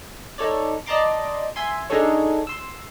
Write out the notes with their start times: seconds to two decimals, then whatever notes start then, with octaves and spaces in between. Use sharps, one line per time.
0.38 D#4 A4 C#5 D5
0.86 D5 D#5 A5 A#5 C6 D6
1.56 E5 G#5 C6
1.90 D4 D#4 G#4 A4 C#5
2.47 C6 E6